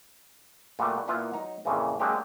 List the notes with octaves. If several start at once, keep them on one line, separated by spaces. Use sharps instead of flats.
A#2 G3 A3 B3 F#4
A#2 A#3 B3 E4 F4
F#3 D#4 A#5
F2 A#2 C#3 E3
F#3 G#3 A#3 C4 D4 G4